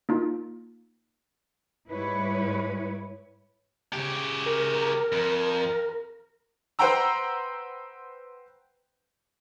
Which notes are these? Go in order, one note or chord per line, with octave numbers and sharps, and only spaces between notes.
A#3 D#4 F4
G#2 G3 E4 B4 C#5
C#3 G4
A#4
F2
B4 C5 F#5 G5 A#5 E6